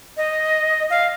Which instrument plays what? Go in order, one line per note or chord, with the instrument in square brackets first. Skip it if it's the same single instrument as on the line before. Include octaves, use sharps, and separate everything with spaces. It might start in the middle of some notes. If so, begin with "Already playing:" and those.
[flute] D#5
F5